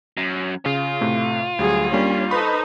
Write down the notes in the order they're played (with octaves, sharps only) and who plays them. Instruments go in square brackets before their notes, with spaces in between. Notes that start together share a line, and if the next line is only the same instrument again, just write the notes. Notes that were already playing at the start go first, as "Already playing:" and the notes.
[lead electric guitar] F#2
[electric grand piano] C#3 [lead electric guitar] F4
[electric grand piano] A2 C3 A3
[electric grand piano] D2 F#3 G3 [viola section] G#4
[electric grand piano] G3 A#3 D4 [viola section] C#4
[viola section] D#4 A4 C5 [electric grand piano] B4 B5 C#6